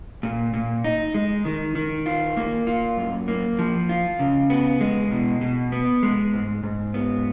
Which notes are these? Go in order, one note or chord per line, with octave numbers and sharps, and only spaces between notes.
A#2
A#2
D#4
G#3
D#3
D#3
F4
A#3
F4
F#2
A#3
F3
F4
C#3
B3
G#3
B2
B2
B3
G#3
G#2
G#2
B3